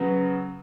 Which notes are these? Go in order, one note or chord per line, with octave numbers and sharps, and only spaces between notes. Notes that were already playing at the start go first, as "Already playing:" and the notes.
Already playing: C#3 F#3 B3